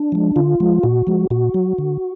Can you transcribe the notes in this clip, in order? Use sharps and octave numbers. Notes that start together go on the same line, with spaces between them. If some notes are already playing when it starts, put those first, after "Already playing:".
Already playing: D4
F3 G#3
D3 F4
F3 G#3
A#2 F#4
F3 G#3
A#2 F#4
F#3
D3